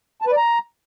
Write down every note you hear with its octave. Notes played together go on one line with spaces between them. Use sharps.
A5
B4
D5
A#5